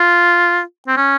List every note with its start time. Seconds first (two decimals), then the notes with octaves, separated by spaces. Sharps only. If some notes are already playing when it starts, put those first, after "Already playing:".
Already playing: F4
0.87 C4
0.97 C#4